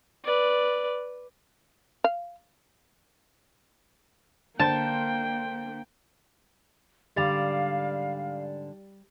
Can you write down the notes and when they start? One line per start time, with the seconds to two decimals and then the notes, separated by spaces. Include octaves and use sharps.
0.24 B4 D5
2.04 F5
4.59 D3 A#3 C5 G5 A5
7.16 G#2 D3 G3 D4 G4 F5 A6 F7